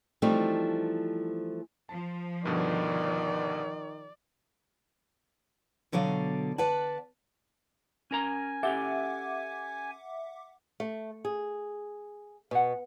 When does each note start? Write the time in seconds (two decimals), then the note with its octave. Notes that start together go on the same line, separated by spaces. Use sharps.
0.22 E3 F3 G3 A3 C4 D#4
1.89 F3 A5
2.45 G2 B2 D3 D#3 D5
5.92 B2 D3 F#3 D5 F5
6.58 B4 D5 F#5 A5
8.11 C#4 A#4 G#5 A#5
8.63 C#4 G4 A4 E5 F#5 D6
10.80 A3
11.25 G#4
12.51 B2 F#5 G#5